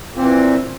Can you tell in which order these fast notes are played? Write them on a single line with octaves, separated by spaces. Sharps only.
A#2 C4 E3